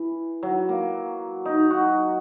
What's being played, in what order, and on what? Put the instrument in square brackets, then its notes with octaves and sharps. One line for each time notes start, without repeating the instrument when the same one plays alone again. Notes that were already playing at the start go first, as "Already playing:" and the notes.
Already playing: [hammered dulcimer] E3
F#3
A#3
D#4
F#4